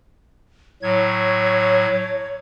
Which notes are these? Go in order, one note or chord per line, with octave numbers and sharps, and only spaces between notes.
A2 F#3 C#5 G#6